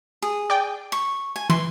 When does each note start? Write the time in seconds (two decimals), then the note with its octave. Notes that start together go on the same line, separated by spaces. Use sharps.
0.22 G#4
0.50 D5 G5
0.92 C#6
1.36 G#5
1.50 E3 C6